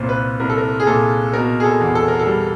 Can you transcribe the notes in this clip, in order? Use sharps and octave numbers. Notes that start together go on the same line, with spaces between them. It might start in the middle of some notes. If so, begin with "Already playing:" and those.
Already playing: C2 A#2 C5
B4
C2 A#4
A4
A#4
G#4
A#2 A4
B2 A#4
G#4
A4
E2
A4
A#4
A4
G3